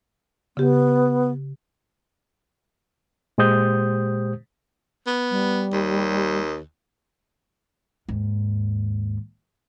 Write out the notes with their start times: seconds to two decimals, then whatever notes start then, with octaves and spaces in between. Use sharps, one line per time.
0.57 C#3 B3 G4
3.38 A#2 G#3 G4 C5 D#6 G6
5.07 B3
5.30 G3
5.73 D#2
8.08 D#2 G#2